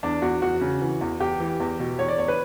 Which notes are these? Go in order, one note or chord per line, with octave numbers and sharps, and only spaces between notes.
E2 D4
E2 F#4
E2 F#4
C#3
E3
E2
E2 G4
E3
E2
B2
E2 C#5
D5
E2 C#5
B4